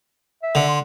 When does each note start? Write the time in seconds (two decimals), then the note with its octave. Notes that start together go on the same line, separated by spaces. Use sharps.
0.43 E5
0.55 D3
0.68 C6